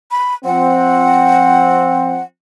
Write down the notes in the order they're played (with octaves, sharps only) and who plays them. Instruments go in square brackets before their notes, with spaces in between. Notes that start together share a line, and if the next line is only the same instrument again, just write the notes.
[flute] B5
[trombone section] F3 C4 [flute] F#5